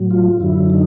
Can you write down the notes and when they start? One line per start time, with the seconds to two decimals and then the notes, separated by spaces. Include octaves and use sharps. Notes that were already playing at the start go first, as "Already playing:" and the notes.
Already playing: A2 F#3
0.11 F4
0.40 F#2 D3 F#3 E4
0.70 D#4